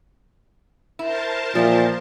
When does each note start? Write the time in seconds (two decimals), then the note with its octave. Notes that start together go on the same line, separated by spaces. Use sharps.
0.99 E4 A#4 C5 A5
1.55 A#2 E3 F3 A3